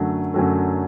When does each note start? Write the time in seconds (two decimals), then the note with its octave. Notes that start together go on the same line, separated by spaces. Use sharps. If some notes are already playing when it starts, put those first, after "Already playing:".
Already playing: F#2 D3 F#3 A3
0.34 F#2 D3 F#3 A3